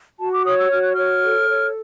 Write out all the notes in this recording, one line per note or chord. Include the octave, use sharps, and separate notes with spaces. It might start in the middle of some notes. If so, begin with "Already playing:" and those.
F#4 A5
D6
C#5 D#6
E6
F#4 F6
F#6
C#5 F6
A4
C#5